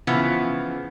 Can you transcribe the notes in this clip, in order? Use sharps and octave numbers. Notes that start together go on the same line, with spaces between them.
C#3 E3 F3 B3